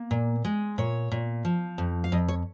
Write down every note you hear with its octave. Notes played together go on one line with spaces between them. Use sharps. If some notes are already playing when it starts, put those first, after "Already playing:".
Already playing: A#3
A#2
G#3
A#2 C#5
A#2
F3
F2
F5
F2 D#5
C#5